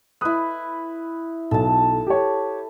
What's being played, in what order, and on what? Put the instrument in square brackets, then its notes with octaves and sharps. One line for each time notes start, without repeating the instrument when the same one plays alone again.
[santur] E4 B4 [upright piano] D#6 F#6
[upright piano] B1 [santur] A4 A5
[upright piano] G4 C#5